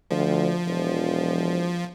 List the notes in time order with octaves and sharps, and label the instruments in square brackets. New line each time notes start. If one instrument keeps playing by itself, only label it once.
[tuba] D2 [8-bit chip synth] F3
[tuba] E1